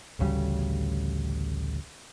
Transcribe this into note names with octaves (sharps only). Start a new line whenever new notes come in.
A1 D2 C#3 G3